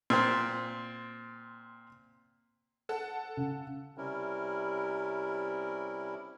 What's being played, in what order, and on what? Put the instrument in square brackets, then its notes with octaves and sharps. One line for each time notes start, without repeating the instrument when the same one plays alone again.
[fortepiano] A#2 C4
[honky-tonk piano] A4 F#5
[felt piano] C#3
[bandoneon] C3 G3 C#4 E4 A#4